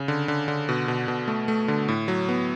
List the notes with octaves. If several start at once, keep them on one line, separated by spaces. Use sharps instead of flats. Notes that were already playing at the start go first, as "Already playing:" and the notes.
Already playing: C#3
D3
D3
D3
B2
B2
B2
A3
A3
D3
A2
F#3
B3